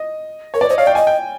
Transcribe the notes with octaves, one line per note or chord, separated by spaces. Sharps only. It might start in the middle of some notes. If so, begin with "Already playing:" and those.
Already playing: D#5
A#4 C#5
B4 D5
C5 D#5
C#5 F5
D5 G5
D#5 G#5
G5